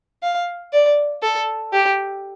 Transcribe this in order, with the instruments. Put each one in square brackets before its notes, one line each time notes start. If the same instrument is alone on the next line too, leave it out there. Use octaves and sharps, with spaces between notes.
[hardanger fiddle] F5
D5
A4
G4